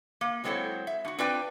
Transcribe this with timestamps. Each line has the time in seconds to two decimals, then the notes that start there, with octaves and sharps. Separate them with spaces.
0.21 A#3
0.44 F#3 G#3 C4 E4 A4 C#5
0.87 E5
1.05 A2 F#4
1.18 C4 D4 F4 B4 D5 G5